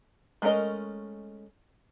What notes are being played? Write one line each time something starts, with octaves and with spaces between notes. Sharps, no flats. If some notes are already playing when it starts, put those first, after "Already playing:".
G#3 A3 C#4 A#4 D#5